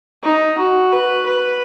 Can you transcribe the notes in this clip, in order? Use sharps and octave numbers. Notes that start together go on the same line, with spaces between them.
D#4
F#4
B4
B4